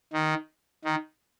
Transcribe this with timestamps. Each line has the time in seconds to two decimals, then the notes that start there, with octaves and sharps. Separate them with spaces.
0.13 D#3
0.85 D#3